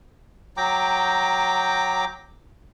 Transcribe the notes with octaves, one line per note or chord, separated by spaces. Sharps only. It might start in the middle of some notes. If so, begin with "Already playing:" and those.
F#3 G5 A#5 D6